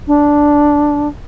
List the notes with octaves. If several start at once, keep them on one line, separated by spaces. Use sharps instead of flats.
D4